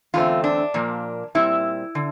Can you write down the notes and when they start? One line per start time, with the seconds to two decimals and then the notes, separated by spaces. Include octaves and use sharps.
0.14 E2 D3 A3 C4 F4
0.44 D4
0.74 A#2 F3 A#3
1.35 A#2 G3 C4 E4
1.95 D3